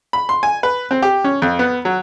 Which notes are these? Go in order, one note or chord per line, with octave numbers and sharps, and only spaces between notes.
B5
C6
G#5
B4
C4
G4
C#4
F2
B3
F#3